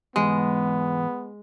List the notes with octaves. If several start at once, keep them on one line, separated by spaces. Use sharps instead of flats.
E2 G#2 G#3 B3